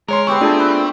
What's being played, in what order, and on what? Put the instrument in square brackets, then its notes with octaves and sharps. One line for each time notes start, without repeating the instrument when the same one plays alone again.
[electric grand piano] G#3 C#5 C6 [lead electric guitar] A#4
[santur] B3 G4 C#6 [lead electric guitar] C4
[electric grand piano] A3 G#4 A5 [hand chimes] D4 F4 D5
[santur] B4